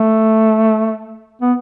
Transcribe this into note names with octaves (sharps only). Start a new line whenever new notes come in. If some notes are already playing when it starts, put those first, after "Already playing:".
Already playing: A3
B3